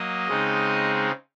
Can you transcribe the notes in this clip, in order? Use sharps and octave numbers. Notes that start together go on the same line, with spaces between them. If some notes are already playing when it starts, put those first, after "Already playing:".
Already playing: F#3 A#3 D#5
C#3 G#3 C4 D#4